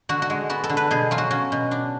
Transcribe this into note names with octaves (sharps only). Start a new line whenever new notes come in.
D3 F#4
F#4
G#3
B3 F#4
A4
D3
B4
B2 G#4
F#3 F4
F#4
C#4 F#4
B2
D4